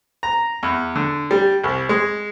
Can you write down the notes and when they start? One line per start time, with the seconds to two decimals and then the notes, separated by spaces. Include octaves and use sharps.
0.23 A#5
0.63 E2
0.95 D3
1.31 G3
1.64 C2
1.89 G#3